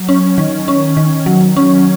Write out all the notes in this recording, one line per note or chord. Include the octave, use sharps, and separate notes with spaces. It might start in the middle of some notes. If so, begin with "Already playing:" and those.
Already playing: F#3
C#4
D#3
C#4
D#3
F#3
C#4